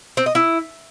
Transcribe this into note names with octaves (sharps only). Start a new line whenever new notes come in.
C4
D#5
E4